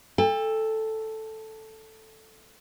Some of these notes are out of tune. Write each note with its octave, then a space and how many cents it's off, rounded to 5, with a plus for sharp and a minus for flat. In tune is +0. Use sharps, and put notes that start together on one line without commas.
A4 +0 G5 +40